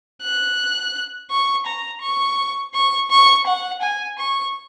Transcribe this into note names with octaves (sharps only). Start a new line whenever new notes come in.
F#6
C#6
A#5
C#6
C#6
C#6
F#5
G#5
C#6